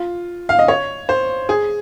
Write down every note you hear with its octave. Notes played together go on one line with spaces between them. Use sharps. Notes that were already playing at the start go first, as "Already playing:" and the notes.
Already playing: F4
F5
D#5
C#5
C5
G#4